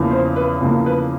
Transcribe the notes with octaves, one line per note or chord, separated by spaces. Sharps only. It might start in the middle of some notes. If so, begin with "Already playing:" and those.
Already playing: E2 C#3 F3 A#3
C5
B4
E2 C#3 F3 A#3
B4